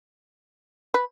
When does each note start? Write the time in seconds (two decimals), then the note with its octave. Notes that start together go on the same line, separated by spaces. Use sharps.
0.94 B4